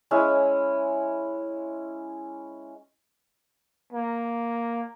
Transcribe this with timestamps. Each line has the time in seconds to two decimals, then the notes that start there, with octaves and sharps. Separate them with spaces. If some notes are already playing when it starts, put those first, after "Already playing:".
0.11 G#3 C#4 E4
3.93 A#3